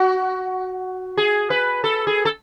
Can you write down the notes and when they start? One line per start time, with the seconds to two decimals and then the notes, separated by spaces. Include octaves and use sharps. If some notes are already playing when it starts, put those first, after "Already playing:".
Already playing: F#4
1.17 G#4
1.50 B4
1.84 A4
2.07 G#4
2.25 A4